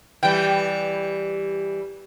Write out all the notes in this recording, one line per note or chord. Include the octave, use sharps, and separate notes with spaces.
E3 G3 G5